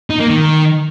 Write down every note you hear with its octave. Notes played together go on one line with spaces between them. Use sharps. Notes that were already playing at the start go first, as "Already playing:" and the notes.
D#4
A#3
D#3